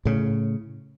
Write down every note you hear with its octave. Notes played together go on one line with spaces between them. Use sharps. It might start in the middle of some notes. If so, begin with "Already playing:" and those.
A2 C#3